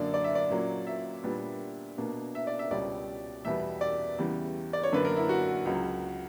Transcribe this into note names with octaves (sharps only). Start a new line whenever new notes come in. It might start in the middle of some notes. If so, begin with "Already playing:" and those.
Already playing: F#2 D3 A#3 D4 D5
D5
E5
D5
A#2 F#3 A#3 C#4
E5
A#2 G3 B3 D4
B2 A#3 D4
E5
D5
E5
C#2 B2 G3 C#4 D5
E2 B2 G3 B3 E5
D5
E2 C#3 E3 G3
D5
C#5
F#2 D3 A#3 D4 B4
A#4
E4
F#4
C#2 C#3 F#3